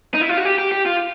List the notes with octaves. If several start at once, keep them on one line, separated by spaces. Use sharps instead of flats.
D#4
E4
F4
F#4
G4
G4
G4
F4